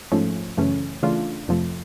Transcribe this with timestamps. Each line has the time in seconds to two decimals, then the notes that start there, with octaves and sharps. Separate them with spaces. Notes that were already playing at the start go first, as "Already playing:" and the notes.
0.12 G#2 F3 A3 C#4
0.57 F#2 C#3 E3 A3 C#4
1.03 C#3 E3 A3 D4 F4
1.48 F2 C3 F3 A3